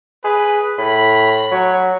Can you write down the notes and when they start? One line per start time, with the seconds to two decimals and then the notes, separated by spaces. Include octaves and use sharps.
0.24 G#4 B4
0.78 A2 B5
1.51 F#3 C#5